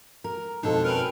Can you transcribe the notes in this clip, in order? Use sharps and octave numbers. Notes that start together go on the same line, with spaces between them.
A#4
F2 B2 F3 G#3 D4 D#4 A4
C#4 A#4 B4 G5 B5 F6